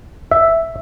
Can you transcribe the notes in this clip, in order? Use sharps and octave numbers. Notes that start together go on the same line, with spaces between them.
E5